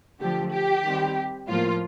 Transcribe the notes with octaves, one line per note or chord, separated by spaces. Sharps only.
D3 F3 A3 G4
G4
D#3 G3 C4
A2 F3 A#3 F4